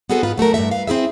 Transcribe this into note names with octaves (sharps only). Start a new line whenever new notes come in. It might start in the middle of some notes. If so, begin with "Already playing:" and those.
B3 C4 F#4 G#4 A4 B4
G#2 B3 F4 B4
F#3 A3 F#4 A#4
G2 B2 A3 E5
B4 F5
C4 E4 G#4 E5